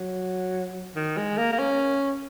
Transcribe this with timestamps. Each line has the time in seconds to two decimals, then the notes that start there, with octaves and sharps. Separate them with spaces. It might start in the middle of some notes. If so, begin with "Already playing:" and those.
Already playing: F#3
0.96 D#3
1.17 G#3
1.38 A#3
1.52 A#3
1.59 C#4